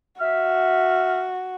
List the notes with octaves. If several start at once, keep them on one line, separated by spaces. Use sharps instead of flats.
F#4 E5 F6